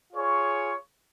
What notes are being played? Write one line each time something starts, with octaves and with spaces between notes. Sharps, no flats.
F4 G#4 C#5